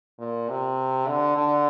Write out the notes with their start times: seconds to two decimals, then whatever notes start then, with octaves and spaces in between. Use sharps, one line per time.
0.19 A#2
0.49 C3
1.08 D3
1.36 D3